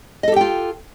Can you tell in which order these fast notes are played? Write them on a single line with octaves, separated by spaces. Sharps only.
D#5 A4 G4 G5 F4